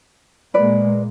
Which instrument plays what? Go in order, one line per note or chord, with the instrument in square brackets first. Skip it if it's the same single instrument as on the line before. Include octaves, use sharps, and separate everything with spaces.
[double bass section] A#2 G#3 A#3 [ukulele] B4 D5